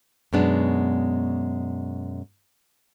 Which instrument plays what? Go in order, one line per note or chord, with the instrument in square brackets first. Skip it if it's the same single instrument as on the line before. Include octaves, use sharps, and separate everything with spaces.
[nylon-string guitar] F#2 B2 G#3 B3 D4